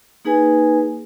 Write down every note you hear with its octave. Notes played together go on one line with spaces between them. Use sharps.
A#3 D#4 G#4 B4 G#5